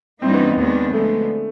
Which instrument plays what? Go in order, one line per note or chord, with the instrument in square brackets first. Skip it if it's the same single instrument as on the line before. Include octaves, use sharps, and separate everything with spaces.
[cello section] G2 E3 G3 A#3 D#4 [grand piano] C4
[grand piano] B3
[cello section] D#2 D#3 G#3 B3 D4
[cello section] D2 D3 F3 G#3 B3 [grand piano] A3